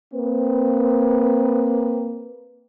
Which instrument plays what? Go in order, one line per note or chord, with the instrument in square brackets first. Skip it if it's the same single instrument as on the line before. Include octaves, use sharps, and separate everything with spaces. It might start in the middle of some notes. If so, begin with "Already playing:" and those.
[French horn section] A#3 C4 B4